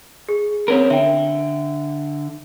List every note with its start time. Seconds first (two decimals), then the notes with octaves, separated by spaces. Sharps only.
0.29 G#4
0.68 C4 C#4 A#4
0.90 D3 E5 G5